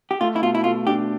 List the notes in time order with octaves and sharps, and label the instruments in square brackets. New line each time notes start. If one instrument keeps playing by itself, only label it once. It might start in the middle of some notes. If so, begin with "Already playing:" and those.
[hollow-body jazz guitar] G4
[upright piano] A3 [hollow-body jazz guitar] F4
[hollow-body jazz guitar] E4
[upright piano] B2 [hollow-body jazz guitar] F4
[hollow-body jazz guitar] E4
[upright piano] A3 [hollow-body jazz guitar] F4
[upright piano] D4 [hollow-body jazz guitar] G4